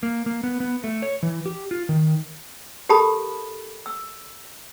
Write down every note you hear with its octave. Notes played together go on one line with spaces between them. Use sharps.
A#3
A#3
B3
B3
A3
C#5
E3
G4
F4
D#3
G4 A4 A#4 A5 B5 D#6
E6